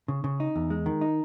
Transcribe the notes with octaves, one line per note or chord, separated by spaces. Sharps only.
C#3
C#3
D#4
E2
G#3
D#3
D#4